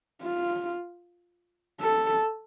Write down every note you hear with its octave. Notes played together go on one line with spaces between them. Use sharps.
F4
A4